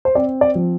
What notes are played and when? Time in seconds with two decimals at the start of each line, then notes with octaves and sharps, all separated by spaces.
0.05 C5
0.15 C4 D5
0.41 D5
0.55 F3